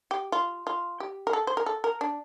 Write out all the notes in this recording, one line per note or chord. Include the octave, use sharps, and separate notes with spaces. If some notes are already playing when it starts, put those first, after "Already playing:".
G4
F4
F4
G4
A#4
A4
C5
A#4
A4
A#4
D4